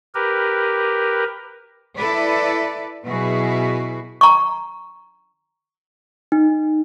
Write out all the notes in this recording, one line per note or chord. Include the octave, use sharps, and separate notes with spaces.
G4 A#4 B4
E4 A4 B4 D5
B2 F#3 E4 F#4 G#4 B4
A#5 C#6
D#4